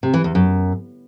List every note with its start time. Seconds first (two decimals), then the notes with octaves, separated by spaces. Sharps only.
0.03 C3
0.14 E3
0.24 E2
0.35 F#2